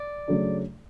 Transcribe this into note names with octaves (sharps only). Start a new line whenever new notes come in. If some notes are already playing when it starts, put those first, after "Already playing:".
Already playing: D5
C#3 F#3 A3 D4